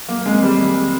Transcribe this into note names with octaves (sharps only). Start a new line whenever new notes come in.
F#3 A#3
G#3 C4
D#3 G3